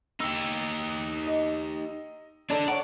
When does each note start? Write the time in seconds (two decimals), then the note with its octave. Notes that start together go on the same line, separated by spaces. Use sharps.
0.20 D#4 G4 E6
1.27 D#5
2.50 D4 A4 D5 A5
2.68 C#5 D5 F#5